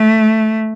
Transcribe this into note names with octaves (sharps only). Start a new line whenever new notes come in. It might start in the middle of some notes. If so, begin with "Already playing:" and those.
Already playing: A3